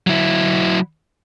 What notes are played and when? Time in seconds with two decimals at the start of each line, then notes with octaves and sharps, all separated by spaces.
0.07 F#3 E4